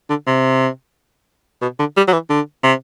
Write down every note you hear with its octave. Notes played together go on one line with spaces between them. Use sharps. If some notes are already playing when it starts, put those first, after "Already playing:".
D3
C3
B2
D3
G3
F#3
E3
D3
C3